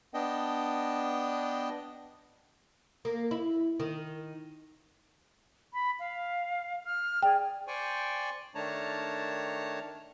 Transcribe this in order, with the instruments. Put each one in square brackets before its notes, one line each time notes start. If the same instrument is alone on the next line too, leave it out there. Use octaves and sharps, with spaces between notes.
[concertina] B3 D4 D#5 G5
[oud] A#3
E4
D#3
[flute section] B5
F5
F6
[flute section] G#4 D5 [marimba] G5
[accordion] C5 D5 G5 G#5 C#6
D#3 A3 D4 C#5 A5 A#5